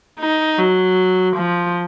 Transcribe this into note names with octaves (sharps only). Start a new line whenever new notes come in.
D#4
F#3
F3